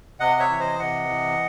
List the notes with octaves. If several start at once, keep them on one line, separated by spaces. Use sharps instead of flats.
C3 D#5 F#5
C#5 E5
E3
C5 D#5
C3 D#5 F#5
E3